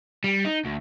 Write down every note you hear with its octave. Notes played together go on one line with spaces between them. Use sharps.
G3
D#4
D2